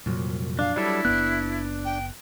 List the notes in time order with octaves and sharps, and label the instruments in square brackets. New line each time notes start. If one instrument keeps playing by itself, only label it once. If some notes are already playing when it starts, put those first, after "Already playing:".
[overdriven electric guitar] C2 [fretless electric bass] F2 A#2 F#3
[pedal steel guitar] D4 [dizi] F5
[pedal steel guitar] F#3 G3 A4 [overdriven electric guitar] D4 [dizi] E4
[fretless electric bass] F#1 E2 B3 [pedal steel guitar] F#6
[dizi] G5